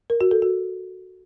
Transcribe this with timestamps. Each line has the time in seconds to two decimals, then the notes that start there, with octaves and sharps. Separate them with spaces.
0.10 A#4
0.21 F#4
0.31 A4
0.42 F#4